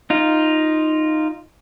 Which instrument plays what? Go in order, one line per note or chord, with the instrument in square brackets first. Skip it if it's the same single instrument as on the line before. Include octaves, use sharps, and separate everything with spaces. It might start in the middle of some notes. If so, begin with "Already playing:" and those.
[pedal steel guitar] D#4 F4